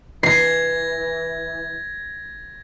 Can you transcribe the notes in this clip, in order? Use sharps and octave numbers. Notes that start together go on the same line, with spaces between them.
E3 G#6 A#6 C7